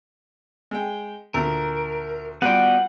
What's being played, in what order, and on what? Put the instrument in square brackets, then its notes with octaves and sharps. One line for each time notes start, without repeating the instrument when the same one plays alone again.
[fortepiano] G#3 G5
[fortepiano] D2 A#2 [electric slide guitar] A#4
[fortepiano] G3 F4 G5 [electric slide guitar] B3 F#4 D5 [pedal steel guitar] F#5